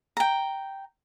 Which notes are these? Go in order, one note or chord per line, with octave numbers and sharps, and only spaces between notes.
G5 A#5